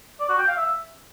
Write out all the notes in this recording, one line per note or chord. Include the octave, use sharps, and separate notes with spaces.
D5
F#4
G5
F5
E5